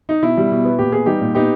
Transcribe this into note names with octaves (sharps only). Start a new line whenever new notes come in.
D#4
B2 E4
G3
B2
B3
A#2 G4
B3 G#4
G3 D#4 G4
A#2
B3 D#4 G4